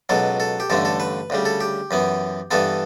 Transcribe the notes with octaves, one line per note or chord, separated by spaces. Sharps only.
C#2 B2 F#3 A4
A4
G4
A1 G2 D3 A3 A4
A4
B4
D2 C#3 G3
A4
G4
F#2 E3 B3
G2 E3 B3 A4